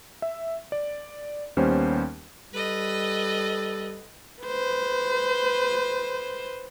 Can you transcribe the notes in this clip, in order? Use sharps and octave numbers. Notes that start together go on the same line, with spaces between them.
E5
D5
D#2 G3 B3 C#4 C5
G3 A4 B4 D#5
B4 C5